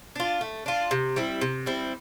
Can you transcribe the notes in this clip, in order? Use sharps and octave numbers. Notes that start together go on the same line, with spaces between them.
D4 F4
A3
D4 F4
C3
G3 C4 E4
C3
G3 C4 E4